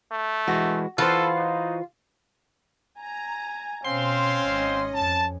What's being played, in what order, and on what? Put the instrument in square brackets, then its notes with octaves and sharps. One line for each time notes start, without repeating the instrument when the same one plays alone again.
[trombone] A3
[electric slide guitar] E3 G#3 [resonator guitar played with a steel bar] F#4
[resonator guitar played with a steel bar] E3 C5 [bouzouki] F4 F5 [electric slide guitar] F#4 B4 [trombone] A4
[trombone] D#4
[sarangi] G#5 [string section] A#5
[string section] B2 [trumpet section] C4 C5 F5 [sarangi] C#4 [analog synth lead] C6
[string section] G#1 D#5
[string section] F2 [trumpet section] A5